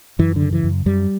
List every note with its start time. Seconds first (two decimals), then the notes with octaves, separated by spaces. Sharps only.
0.19 F#2 E3
0.36 D3
0.42 C#3
0.53 E3
0.64 F#2
0.86 F#2 G3